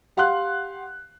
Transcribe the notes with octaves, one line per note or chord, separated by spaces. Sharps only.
G4 F5 F#5 C6 F#6